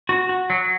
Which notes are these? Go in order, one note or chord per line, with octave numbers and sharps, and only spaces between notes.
F#4
F#4
F#3